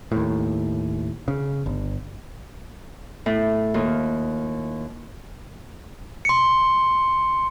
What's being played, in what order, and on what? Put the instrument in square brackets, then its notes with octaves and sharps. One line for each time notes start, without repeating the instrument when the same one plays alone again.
[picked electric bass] D#2 A2
C#3
G1
[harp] A2 E4
D#2 F4
[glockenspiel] C6 C#7